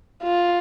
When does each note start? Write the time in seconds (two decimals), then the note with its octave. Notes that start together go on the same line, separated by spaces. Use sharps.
0.23 F4